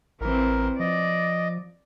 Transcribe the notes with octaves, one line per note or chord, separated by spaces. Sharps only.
A1 E3 C4 A#4
F3 D5 D#5